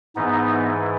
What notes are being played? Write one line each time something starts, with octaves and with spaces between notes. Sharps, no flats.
G#2 E3 B3 D#4